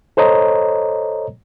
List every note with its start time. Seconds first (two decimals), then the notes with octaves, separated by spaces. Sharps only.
0.17 A4 C5 C#5 D#5 A#5